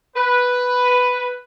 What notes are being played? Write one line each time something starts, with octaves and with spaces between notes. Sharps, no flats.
B4